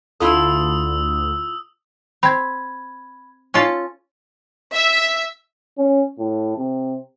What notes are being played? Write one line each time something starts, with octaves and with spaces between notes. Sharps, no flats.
D2 E4 F4 A4 D#6 E6
C4 B5 G#6
C#4 F4 A4
E5
C#4
A2
C3